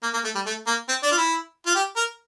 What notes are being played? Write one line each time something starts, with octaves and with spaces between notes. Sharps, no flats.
A#3
A#3
A3
G3
A3
A#3
C4
D4
F4
E4
F4
G4
A#4